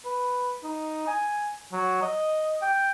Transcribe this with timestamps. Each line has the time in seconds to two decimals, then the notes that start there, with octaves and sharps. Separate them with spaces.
0.05 B4
0.63 D#4
1.07 G#5
1.72 F#3
2.02 D#5
2.62 G5